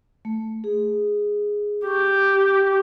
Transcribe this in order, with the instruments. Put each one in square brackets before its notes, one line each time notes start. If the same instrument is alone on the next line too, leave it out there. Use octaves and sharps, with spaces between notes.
[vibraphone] A3
G#4
[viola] G4 [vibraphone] C#6